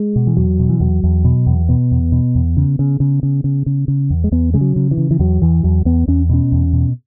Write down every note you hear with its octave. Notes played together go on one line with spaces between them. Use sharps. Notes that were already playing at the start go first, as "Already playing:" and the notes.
Already playing: G#3
B2
E3
E2 F#3
B2
E3
E2 F#3
E2
B2
E2
B2 B3
E2
B2
E2
C#3
C#3
C#3
C#3
C#3
C#3
C#3
E2
G#3
E2 B3
C#3 G#3
F#3
C#3
E3
C#3
E3
E2 F#3
E2 E3
E2 F#3
E2 B3
E2 C#4
B2 C#4
E2
B2